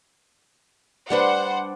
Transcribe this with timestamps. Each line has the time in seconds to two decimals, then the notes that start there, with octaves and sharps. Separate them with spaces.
1.10 G3 D4 B4 C5 F#5